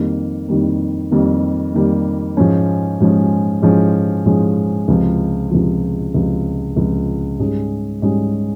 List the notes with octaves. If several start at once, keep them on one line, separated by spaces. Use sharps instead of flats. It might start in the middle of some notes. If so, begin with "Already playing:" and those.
Already playing: F2 D#3 G3 A#3
F2 D#3 G3 A#3
F2 D#3 G3 A#3
F2 D#3 G3 A#3
G#2 F3 G#3 C#4
G#2 F3 G#3 C#4
G#2 F3 G#3 C#4
G#2 F3 G#3 C#4
C#2 C3 F3
C#2 C3 F3
C#2 C3 F3
C#2 C3 F3
G#2 G3 C#4 G#4
G#2 G3 C#4 G#4